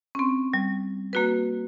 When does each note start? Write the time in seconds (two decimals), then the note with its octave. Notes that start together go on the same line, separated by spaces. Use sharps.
0.15 C4 C#4
0.54 G3
1.13 A#3 F#4 B4